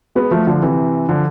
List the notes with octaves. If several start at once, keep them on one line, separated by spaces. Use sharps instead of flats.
G#3 B3
F3 A3
D3 F3
C3 E3
D3 F3